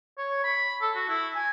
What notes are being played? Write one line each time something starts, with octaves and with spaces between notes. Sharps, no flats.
C#5
B5
A4
F#4
E4
G#5